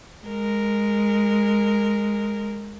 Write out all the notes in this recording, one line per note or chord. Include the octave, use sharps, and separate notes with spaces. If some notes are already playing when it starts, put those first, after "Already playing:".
G#3 A#4